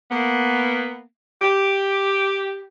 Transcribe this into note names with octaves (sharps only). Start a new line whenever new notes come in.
A#3 B3
G4